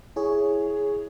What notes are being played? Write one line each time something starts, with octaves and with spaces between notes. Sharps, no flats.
E4 G#4 C#5